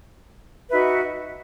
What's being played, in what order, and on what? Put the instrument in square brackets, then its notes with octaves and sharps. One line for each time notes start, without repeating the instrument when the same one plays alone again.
[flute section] D#4 F#4 B4 E5